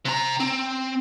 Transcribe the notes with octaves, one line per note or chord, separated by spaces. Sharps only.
C3 A#5
C4